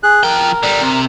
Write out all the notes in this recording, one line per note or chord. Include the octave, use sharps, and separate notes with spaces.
G#4 F#6
F3 A#4 G5
D3 G3
C3